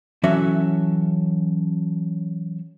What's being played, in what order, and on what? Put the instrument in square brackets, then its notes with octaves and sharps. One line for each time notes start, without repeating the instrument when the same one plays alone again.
[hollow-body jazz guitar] E3 F#3 C#4 F#4 A4 E5